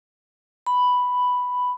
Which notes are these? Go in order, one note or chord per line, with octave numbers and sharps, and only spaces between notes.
B5